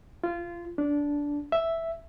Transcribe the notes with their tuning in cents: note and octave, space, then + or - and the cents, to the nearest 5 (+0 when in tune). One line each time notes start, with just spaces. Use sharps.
F4 -20
D4 -15
E5 +0